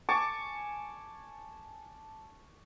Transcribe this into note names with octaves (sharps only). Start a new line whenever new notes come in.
G#5 A5 C#6 D6